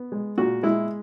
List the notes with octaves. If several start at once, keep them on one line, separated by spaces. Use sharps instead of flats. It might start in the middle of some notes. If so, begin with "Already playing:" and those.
Already playing: B3
G#3
A#2 F#4
G#3 E4